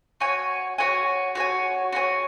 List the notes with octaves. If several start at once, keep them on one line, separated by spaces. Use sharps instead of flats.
F#4 C#5 G#5
F#4 C#5 G#5
F#4 C#5 G#5
F#4 C#5 G#5